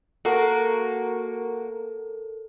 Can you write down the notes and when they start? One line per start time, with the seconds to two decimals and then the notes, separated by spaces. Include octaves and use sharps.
0.25 A#3 F#4 A4 A#4